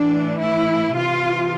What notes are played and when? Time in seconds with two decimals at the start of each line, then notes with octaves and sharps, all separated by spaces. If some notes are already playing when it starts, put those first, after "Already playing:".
Already playing: A2 E3 D4
0.41 E4
0.95 C3 E3 F4